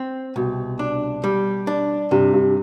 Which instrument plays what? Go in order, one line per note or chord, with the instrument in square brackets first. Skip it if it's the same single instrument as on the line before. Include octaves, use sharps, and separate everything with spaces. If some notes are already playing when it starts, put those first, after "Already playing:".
Already playing: [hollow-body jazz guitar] C4
[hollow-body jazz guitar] C2 [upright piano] B2
[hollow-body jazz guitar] D4
G3
D4
[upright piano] G2 [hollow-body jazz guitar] C3
[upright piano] G2